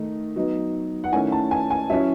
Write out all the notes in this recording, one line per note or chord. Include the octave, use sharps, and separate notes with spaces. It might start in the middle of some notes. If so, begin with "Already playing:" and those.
Already playing: D#3 A3 D#4
F#3 B3 D#4
F#5
D#3 A3 C#4 E4 G#5
A5
G#5
G#5
F#3 C#4 E4 E5